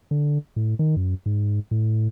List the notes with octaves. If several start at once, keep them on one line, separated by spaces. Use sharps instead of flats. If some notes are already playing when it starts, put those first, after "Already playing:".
D3
A2
D#3
F#2
G#2
A2